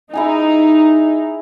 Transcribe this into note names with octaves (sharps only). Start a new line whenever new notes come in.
D#4 E4 G#4 G#5